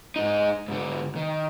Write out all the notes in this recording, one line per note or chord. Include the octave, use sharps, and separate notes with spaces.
G#2 D#4
G#2 D3
D#3